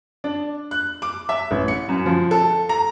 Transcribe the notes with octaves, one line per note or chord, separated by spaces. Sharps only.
D4
F#6
D6
E5
A1
C#7
F#2
F3
A4
A#5